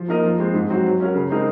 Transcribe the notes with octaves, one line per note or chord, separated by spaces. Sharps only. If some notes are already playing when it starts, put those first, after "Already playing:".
Already playing: F3
A#3 D#4 A#4 D#5
F3
G#3 C4
G#2
F#3 C4 F#4
F#3
C#4 F#4 A#4
C#3
G#3 C4 D#4 A#4